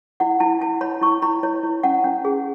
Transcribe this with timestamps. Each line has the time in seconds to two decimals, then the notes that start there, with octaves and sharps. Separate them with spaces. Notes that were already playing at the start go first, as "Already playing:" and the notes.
0.20 E4 F#5
0.40 E4 A5
0.61 E4 A5
0.81 C#5 B5
1.01 E4 C#6
1.22 E4 B5
1.43 E4 C#5
1.63 E4
1.83 C#4 F#5
2.04 C#4
2.25 G#4